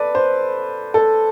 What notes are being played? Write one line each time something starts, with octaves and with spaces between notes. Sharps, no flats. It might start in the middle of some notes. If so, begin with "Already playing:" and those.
Already playing: A4 B4 D5
C5
A4